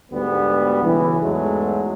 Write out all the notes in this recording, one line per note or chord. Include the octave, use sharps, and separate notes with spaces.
D2 G#2 G3 B3
B1 C#3 E3
E2 G#2 F#3 G#3 A3